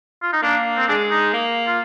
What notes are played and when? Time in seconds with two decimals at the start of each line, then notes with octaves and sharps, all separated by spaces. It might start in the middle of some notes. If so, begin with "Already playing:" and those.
0.23 F4
0.33 D#4
0.43 A#3 D4
0.77 C4
0.88 G#3 D4
1.11 D#4
1.34 A#3
1.67 F4